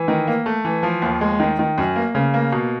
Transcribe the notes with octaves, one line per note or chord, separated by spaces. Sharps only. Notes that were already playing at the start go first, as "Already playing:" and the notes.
Already playing: E3
D#3
A#3
A3
E3
F3
D#2
G#3
D#3
D#3
F#2
A#3
C#3
A#3
B2